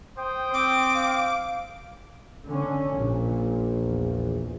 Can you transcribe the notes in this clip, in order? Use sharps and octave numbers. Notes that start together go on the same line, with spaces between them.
C5 G5 D#6
C4 D6
F5
D3 C#4
A#1 A#2
E2